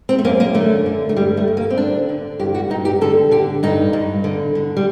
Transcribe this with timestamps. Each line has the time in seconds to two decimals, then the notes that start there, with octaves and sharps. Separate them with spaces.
0.09 C4
0.19 A3
0.24 F#2 A#3
0.40 A#3
0.54 D3 A3
0.86 D3
1.09 A3
1.16 G2 G3
1.37 A3
1.48 G2
1.57 A#3
1.70 C4
1.77 D3 D4
2.09 D3
2.40 G2 G4
2.55 F#4
2.70 G2 D#4
2.85 G4
3.01 D3 A4
3.31 D3 G4
3.63 G2 D#4
3.93 G2
4.24 D3
4.55 D3
4.77 G3